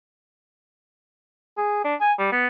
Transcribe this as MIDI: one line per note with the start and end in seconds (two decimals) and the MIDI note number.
1.57 1.80 68
1.85 1.95 62
2.01 2.13 80
2.19 2.29 55
2.32 2.47 59